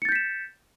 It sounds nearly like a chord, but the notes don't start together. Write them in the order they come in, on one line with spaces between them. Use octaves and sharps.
C#7 A6 G6 B6 E7